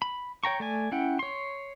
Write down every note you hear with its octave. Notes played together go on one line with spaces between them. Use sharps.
B5
C#5 G5 A#5 C#6
A3 D5 G#5
C#4 E4 F#5 G5
C#5 C6